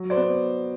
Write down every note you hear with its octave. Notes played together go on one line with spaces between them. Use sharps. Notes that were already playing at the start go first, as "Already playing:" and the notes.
Already playing: F#3
C5 D5
B3